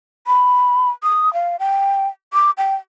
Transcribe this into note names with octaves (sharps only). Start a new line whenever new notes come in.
B5
D#6
F5
G5
D6
G5